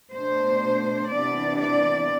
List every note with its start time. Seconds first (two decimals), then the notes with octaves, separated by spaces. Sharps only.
0.15 B2 A3 D4 C5
1.14 C3 E3 B3 D4 D5
1.62 D5